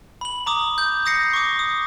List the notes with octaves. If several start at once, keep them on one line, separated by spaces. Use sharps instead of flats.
B5 F#7
A#5 D6 D#6
G6
D#6 G6 A#6 C7 C#7
C#6 D6
D#6